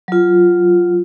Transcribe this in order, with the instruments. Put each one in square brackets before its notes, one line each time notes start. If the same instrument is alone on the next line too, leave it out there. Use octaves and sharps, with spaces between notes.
[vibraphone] F#3 F4